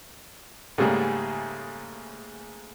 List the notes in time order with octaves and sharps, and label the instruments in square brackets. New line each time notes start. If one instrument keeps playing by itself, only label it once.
[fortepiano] G#2 C#3 G3 A3 A#3 G#4